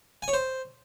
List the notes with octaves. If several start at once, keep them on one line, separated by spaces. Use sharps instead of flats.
G#5
C#5
C5